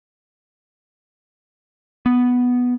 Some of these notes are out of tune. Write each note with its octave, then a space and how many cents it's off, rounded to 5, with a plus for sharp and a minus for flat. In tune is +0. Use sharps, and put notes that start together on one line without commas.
B3 +0